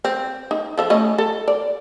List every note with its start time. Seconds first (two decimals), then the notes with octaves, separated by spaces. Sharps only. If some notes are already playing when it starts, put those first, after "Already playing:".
0.05 C4
0.51 D#4
0.78 F3 A4 E5
0.90 A3 C#4 D#5
1.18 A4
1.48 D5